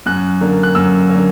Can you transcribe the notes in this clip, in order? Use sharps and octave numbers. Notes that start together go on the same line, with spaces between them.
F#2 F#6
D3 A#3
F#6
F#2 E6
D3 A#3